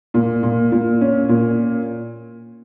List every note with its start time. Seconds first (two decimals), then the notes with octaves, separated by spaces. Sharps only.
0.14 A#2
0.43 A#2
0.72 A#2
1.01 C#4
1.29 A#2